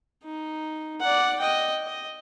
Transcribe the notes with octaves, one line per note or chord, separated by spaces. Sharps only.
D#4
D5 F#5
D#5 G5
D#5